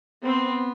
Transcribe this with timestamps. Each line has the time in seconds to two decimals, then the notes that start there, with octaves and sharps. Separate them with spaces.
0.24 B3 C4